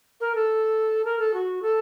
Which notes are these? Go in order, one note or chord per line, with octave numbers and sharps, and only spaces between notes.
A#4
A4
A#4
A4
F#4
A4